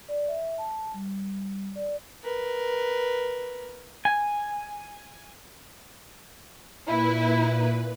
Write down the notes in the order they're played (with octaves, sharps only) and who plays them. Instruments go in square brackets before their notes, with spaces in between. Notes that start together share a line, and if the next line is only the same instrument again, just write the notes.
[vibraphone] D5
E5
A5
G3
D5
[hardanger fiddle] A#4 B4
[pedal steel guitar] G#5
[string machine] A#2 B4 [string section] E4